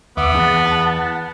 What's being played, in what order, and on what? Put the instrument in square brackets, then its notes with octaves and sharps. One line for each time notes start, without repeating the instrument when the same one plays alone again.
[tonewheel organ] D#2 E5 D6 [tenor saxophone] B3
[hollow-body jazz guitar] E2 [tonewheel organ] F#5 A5